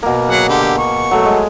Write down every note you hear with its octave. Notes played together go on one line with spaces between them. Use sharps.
B2 A#3
F#3 G#4 F#5
D3 G4
C#6
F#3 A3
G#3